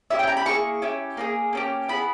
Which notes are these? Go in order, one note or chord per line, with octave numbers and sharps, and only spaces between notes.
C#4 E4 G4 E5
G5
A#5
B5
A#3 E4 G#4 C#6
C#4 E4 G4
A#3 D#4 G#4
A#3 C#4 G4
B3 E4 G#4 B5